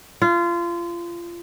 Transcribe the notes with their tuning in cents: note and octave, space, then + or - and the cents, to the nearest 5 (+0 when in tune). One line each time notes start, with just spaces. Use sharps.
F4 -25